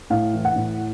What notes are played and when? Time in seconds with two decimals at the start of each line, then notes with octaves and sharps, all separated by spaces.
0.10 A2 F5
0.34 E3
0.45 F#5
0.56 A2